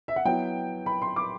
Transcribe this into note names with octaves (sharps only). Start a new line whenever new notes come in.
E5
F#5
F#3 B3 E4 G5
B5
C6
D6